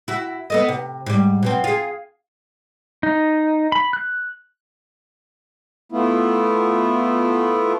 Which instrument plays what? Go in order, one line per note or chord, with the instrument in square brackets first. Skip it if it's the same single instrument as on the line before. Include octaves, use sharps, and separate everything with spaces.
[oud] E4 F#4
B3 A4 D#5
C3
G#2 G3
B2 F#3 C4
F4 G#4
[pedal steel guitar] D#4
B5
F#6
[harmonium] A3 B3 E4 F4